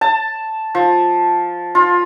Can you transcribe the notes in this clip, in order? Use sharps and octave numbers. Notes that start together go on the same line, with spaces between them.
A5
F3
F4